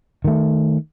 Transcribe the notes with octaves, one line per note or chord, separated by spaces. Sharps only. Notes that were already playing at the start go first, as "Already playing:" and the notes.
D#3 A3